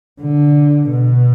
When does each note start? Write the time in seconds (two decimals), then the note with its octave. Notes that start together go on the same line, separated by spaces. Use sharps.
0.21 D3
0.89 B2